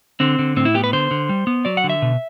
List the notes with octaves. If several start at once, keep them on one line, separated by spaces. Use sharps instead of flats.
D3 C4
D3
A2 C4
E4
B3 G4
B4
D3 C5
D3
G3
B3
F#3 D5
F#5
D3
E5
B2